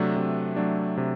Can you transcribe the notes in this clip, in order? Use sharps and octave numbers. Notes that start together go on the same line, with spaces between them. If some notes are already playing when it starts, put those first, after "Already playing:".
Already playing: C3 F#3 A3 D4
C3
F#3 A3 D4
C3